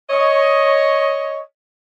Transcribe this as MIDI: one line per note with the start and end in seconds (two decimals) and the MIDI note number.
0.10 1.40 73
0.10 1.40 75